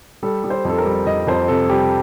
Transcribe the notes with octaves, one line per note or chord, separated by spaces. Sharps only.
G3 A4
G3
C5
F2 A4
A#4
G3
F2 D#5
F2 C5
C3 A4
G3 G4